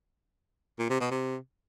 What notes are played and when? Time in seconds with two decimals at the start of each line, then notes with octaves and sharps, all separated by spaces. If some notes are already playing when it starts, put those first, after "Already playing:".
0.79 A#2
0.90 C3
1.00 B2
1.11 C3